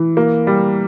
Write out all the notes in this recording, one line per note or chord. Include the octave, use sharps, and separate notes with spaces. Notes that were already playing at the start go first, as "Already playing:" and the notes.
Already playing: E3
A#3
G3